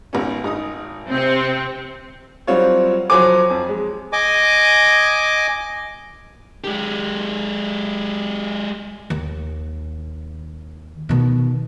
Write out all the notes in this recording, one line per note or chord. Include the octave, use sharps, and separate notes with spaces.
G#1 B3 C#4
G#1 D#4 D#6
C3 C4
F#3 G3 C4 F4 C#5
F3 F#3 C5 G#5 D6
F2
G#3
D#5 G#5 D6
G#3 G4
D#2
B2 D#3